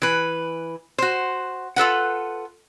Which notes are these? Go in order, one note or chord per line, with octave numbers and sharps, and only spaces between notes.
E3 B4
F#4 C5
F4 A4 B4 F#5